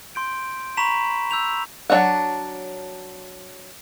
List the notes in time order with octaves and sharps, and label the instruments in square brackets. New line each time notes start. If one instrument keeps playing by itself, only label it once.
[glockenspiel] C6 G6 D7
A#5 B5 C#6 B6 E7 F#7
E6 G6 F7
[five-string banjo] F#3 D4 D#4 C#5 F#5